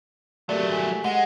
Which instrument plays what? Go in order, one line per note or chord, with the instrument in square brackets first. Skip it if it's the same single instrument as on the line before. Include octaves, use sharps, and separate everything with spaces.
[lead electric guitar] F#3 A3 [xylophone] G4 A#4 D5
[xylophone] G#5 B6
[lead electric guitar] G#3 [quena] F#5